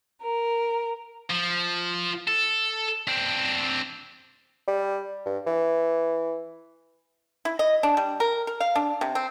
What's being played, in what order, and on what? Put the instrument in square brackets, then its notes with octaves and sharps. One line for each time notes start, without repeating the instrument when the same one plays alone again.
[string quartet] A#4
[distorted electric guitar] F3
A4
C4 D4
[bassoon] G3
G2
E3
[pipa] E4
D#5
D4
G3
A#4
A#4
F5
D4
C3
C4